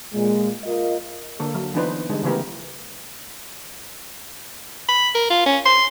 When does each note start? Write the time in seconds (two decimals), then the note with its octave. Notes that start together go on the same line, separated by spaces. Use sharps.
0.12 A#2 G#3
0.63 F4 A#4 D#5
1.39 D3 A#3 A4
1.55 F#3
1.74 E3 B3 D4 D#4 B4 C5
2.09 D3 G3 G#3 D#4
2.24 C#3 E3 A3 B3 G4 A#4
4.89 B5
5.15 A#4
5.30 F4
5.46 C#4
5.66 C6